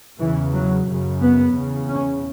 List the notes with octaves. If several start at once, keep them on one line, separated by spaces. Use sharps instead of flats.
E2 C#3 E3
F#3
F#2 C#3
B3
E2 C#3
C#4